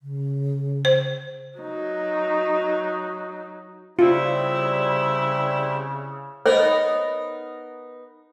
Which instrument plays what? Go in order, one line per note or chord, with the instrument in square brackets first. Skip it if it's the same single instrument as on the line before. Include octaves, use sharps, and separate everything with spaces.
[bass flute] C#3
[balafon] C5
[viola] F#3 D#4
[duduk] C#3 [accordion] G3 C4 [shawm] E4 [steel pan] F4
[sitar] B3 D#4 A#4 [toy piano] C5 C#5